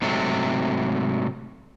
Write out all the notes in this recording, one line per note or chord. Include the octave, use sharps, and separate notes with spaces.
G#2 C3 F#3 A3